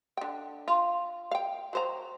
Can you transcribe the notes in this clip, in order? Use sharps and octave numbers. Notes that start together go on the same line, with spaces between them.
D3 G5
F4
F5 G5
F#3 C5 A#5